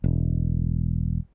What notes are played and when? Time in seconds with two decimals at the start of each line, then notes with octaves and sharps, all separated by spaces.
0.04 E1